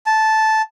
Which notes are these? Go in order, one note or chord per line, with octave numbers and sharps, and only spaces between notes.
A5